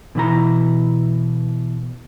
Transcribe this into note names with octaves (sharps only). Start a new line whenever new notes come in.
B2 E3 E4 A#5